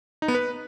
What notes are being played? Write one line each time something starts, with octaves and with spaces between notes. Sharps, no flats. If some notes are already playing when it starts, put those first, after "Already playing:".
D#4
B3
B4